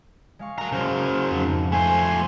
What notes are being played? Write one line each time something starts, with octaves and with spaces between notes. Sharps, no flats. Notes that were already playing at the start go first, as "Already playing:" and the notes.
G#3 F5 C#6
A3 F#4 A#4 D#5 A#5
C#3 F#3 C5 F5
F2 G#2
A3 C5 G#5